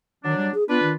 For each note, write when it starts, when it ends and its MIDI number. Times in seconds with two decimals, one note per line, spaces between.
0.25 0.36 51
0.25 0.52 54
0.25 0.52 62
0.37 0.51 55
0.54 0.64 68
0.69 0.81 59
0.69 0.92 62
0.69 0.92 65
0.69 0.92 71
0.82 0.96 51